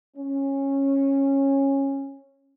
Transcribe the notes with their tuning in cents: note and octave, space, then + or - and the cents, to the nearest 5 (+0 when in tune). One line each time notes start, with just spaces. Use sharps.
C#4 -15